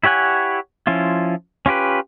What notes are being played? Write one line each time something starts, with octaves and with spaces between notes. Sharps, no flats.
E4 G4 C#5 F#5 G#5
F3 C#4 E4 F4
C#4 F4 G4 B4